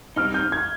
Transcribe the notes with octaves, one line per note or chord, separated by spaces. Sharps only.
C3 G3 C4 D#4 F6
G6
G#6